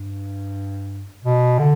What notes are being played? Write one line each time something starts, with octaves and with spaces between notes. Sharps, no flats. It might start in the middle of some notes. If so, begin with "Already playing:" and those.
Already playing: G2
B2
D3